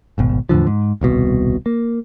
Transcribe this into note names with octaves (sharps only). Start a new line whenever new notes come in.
D#1 G#1 B2
E2 A2 D3 F3
G#2
D#1 C2 B2
A#3